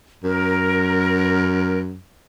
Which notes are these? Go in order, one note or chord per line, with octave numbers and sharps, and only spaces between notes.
F#2 A#4